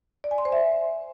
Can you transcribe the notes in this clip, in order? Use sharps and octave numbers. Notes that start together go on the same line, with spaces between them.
D5
G#5
C6
C5
E5